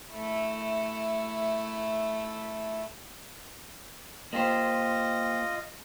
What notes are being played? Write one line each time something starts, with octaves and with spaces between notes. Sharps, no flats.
A3 E4
A#3 F4 G4 C5 D#5